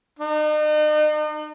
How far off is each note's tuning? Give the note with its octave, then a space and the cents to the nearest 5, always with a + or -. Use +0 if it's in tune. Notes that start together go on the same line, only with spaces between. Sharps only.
D#4 -40